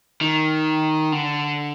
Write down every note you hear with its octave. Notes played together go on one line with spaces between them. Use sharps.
D#3
D3